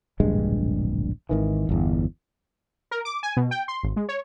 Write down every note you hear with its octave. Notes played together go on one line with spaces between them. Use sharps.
D1 A#1 G2 G#3
G#1 D#3 E3
G1 E2
A#4
D6
G#5
B2
G5
C6
G#1
G#3
C#5